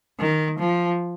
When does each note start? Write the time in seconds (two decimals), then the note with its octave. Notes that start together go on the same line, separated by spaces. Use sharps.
0.19 D#3
0.59 F3